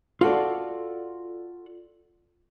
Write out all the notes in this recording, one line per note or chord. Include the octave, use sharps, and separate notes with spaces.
F4 F#4 A4 D5